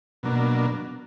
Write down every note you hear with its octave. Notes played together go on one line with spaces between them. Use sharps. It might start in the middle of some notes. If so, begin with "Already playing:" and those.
B2 F#3 A#3 D4